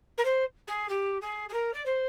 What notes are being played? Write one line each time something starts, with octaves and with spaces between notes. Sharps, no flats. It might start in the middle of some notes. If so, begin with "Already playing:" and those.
A#4
C5
G#4
G4
G#4
G#4
A#4
D5
C5